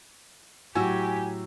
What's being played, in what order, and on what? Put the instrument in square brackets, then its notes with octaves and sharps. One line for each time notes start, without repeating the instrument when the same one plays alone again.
[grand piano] A2 F#3 E6 [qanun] F#4 [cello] G4 [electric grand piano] G#5